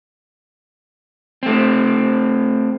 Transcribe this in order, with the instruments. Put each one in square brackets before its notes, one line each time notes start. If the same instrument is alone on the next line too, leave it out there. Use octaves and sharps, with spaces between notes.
[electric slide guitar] A3 C4